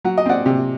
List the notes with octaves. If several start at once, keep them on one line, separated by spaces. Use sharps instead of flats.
F#3 F#5
D#5
C4 D5 F#5
C3